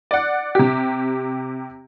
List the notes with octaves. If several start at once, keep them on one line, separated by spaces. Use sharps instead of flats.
D5 F#5
C3 G4